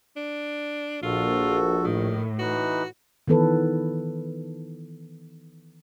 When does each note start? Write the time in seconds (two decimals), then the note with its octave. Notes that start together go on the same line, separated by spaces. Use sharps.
0.16 D4
1.03 A#1 F4 F#4 A4
1.84 A2 D#3
2.39 E3 D#4 F#4 B4
3.27 D#3 E3 B3 A4 B4